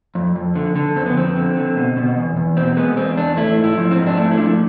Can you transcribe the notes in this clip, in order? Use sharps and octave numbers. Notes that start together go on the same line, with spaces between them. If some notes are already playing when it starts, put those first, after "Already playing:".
F2
F2
D3
D3
F2 C4
B3
F2 C4
D3
D3
B2
B2
E2
E2
B2 C4
G#3 B3
E2 C4
E2 D4
A3 E4
G#2
E4
F3
C4
G#2
D4
A3 E4
E4
F3 D4